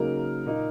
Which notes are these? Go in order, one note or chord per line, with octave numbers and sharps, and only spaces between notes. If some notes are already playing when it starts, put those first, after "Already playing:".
Already playing: C#3 F#3 A#3 D#4 A#4
A#2 A#3 D#4